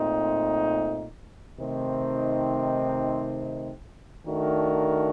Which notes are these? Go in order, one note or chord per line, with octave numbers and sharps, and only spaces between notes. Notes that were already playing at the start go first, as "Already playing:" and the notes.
Already playing: A#2 A3 C4 D#4
C3 D#3 A3 C4 D#4
D#3 A3 D4 F#4 A#4